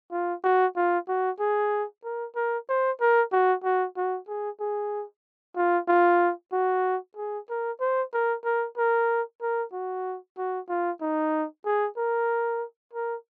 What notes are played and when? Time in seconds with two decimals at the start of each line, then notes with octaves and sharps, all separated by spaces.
0.12 F4
0.44 F#4
0.76 F4
1.08 F#4
1.40 G#4
2.04 A#4
2.36 A#4
2.69 C5
3.01 A#4
3.32 F#4
3.64 F#4
3.97 F#4
4.28 G#4
4.61 G#4
5.57 F4
5.88 F4
6.53 F#4
7.17 G#4
7.49 A#4
7.80 C5
8.13 A#4
8.44 A#4
8.77 A#4
9.42 A#4
9.73 F#4
10.38 F#4
10.69 F4
11.01 D#4
11.66 G#4
11.97 A#4
12.93 A#4